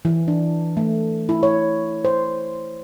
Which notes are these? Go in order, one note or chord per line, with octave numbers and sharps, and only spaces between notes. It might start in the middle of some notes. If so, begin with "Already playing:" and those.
E3
D4
A3
E4
C#5
C5